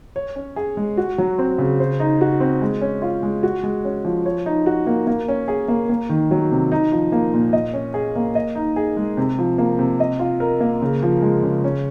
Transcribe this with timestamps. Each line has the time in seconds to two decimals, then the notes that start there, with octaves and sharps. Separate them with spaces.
0.16 C#5
0.36 C#4
0.56 G#4
0.77 G#3
0.97 F#4
1.18 F#3
1.38 C4
1.58 C#3
1.80 C5
2.00 D#4
2.21 F#4
2.40 C4
2.62 G#3
2.81 C#4
3.02 F4
3.23 G#3
3.43 F#4
3.63 G#3
3.85 C#4
4.05 F3
4.26 C#5
4.46 D#4
4.66 F#4
4.87 A#3
5.07 A#3
5.28 C#4
5.48 G#4
5.68 A#3
5.89 A#3
6.09 D#3
6.31 F#3
6.51 C3
6.72 D#4
6.92 F3
7.12 A#3
7.33 A#2
7.53 D#5
7.74 C#4
7.94 G#4
8.16 A#3
8.35 D#5
8.55 D#4
8.76 G#4
8.97 G#3
9.17 C3
9.39 F3
9.58 A#3
9.79 C3
10.00 D#5
10.19 F4
10.40 A#4
10.60 A#3
10.82 C#3
11.03 F3
11.22 G#3
11.43 C#3
11.64 C#4